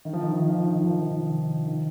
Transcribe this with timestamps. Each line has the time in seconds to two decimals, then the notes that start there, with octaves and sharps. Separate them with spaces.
0.05 D#3
0.13 F3
0.23 D#3
0.32 F3
0.41 D#3
0.49 F3
0.58 D#3
0.67 F3
0.76 D#3
0.85 F3
0.93 D#3
1.02 F3
1.11 D#3
1.66 D#3